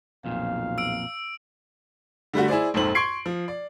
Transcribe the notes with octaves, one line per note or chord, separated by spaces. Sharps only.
B1 F2 A#2 F5
E6 D7
D3 G3 A3 F#4
E4 G#4 C5 D5
A#1 F2 G#2 A4 C5 F#7
C6 C#6 G#6 C7 D7
F3
D5